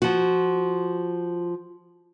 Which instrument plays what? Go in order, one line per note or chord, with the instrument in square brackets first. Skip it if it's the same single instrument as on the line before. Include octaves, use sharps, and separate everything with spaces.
[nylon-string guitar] F3 F#4